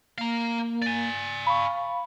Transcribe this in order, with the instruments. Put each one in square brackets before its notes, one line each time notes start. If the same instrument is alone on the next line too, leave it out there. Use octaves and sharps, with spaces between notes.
[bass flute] A#3 [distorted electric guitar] F5 A#5
[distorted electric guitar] D5 G#5
[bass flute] F5 [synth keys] B5 C#6